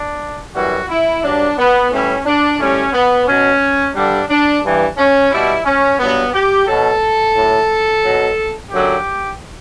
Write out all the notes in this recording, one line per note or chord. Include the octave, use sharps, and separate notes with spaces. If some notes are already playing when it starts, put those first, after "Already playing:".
Already playing: D4
F#2 E3 G3 F#4
E4
G2 F#3 D4
B3
A2 E3 G3 C#4
D4
A2 G3 C#4
B3
B2 F#3 C#4
G2 D3 G3 D4
D4
G2 E3 G3
C#4
B2 G3 E4
C#4
G2 F#3 B3
G4
B2 F#3 A4
A2 F#3
B2 F#3
F#2 D3 F#3 G4